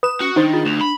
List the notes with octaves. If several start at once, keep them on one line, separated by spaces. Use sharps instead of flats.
B4 D#6 E7
C#4 F#4
D#3 D4 D#4 C5
F4 G#4 A6
D2 E7 F7
B5